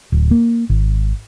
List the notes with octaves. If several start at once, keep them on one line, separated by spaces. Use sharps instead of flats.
D1
A#3
G#1